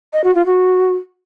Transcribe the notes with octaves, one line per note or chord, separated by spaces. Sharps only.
D#5
F#4
F4
F#4